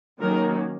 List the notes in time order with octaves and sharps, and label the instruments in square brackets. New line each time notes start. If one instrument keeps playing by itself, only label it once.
[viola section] D#3 F#3 A#3 C#4 A#4